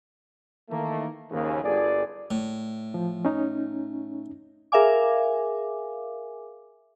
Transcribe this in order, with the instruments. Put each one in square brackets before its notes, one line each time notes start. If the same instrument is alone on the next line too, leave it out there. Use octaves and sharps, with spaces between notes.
[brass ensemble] D#3 E3 A3 A#3
D#2 G#2 C#3
G1 G#4 D5
[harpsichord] A2
[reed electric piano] F3
C#4 D#4
[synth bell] G#4 A#4 E5 F5 G#5 D6